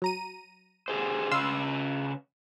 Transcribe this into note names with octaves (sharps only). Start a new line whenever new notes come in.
F#3 A#5 D#7
G4 G#4 C5
C#3 B4 F5 C6 E6